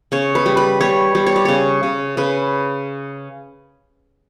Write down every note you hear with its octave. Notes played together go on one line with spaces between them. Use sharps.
C#3 C#5
B4
G3
B4
G3 C#5
G3
C#5
D5
C#3 C#5
C#3
C#3 B4